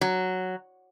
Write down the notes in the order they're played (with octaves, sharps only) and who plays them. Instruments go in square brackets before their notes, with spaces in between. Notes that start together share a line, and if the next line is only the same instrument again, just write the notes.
[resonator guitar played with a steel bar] F#3